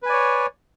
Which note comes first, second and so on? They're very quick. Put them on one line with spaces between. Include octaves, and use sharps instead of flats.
B4 G#5 D5 C#5